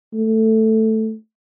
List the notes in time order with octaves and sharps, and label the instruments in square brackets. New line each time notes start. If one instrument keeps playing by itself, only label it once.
[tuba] A3